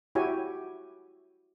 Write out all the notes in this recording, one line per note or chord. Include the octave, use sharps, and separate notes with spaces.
E4 F#4 G4 C#5 G#5